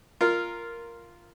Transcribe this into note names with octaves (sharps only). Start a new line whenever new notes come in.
F4 A#4